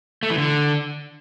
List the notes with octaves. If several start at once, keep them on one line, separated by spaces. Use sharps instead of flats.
A3
E3
D3